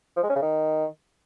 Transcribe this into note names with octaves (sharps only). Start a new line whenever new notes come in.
F3
G#3
C#4
C#3
D#3